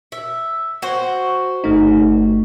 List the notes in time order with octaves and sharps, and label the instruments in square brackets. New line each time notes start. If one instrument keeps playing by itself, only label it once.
[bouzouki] E5
F#4 C5
[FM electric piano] G1 A3 D#4